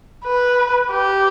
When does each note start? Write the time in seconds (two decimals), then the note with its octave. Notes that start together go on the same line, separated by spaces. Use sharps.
0.25 B4
0.91 G4